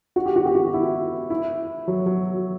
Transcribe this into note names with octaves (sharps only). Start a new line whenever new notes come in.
F#4
G4
F#4
G4
F#4
E4
E4
F#3
F#3